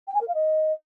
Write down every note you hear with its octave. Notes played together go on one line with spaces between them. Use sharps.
G5
G#5
A#4
F5
D#5